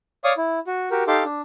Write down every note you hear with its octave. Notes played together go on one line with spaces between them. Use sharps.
C#5 D5 F5 C#6 D#6
E4
F#4
F#4 G4 A#4
D#4 G4 A4 F5 C6 D6
D4